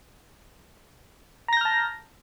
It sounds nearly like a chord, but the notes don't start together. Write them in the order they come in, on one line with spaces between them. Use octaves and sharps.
A#5 A#6 G6 F6 A5